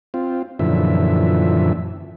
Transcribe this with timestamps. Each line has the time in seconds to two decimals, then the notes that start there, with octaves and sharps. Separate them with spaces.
0.14 C4 F4
0.59 F#2 A#2 D3 E3 F3 E5